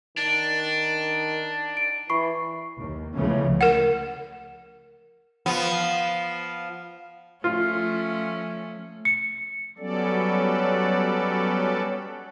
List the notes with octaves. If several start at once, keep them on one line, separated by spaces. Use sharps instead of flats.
D#3 D4
D7
E3 B5 C#6 C7
D#2
C#2 C#3 E3 F3 A3 C#4
A#4 F#5
F3 B3
F3 A3 C#4 F4
C#7
F#3 G3 B3 C#4 A4 D5